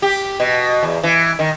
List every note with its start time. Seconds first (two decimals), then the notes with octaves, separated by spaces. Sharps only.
0.02 G4
0.40 B2
0.83 E2
1.03 E3
1.39 D#3